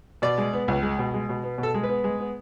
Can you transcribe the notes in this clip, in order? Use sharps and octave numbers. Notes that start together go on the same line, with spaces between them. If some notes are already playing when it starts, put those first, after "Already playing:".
B2 D5
G#3
B3
C#2
G#3
B2
G#3
B2
B3
B2
A4
G#3
B4
B3
G#3
B3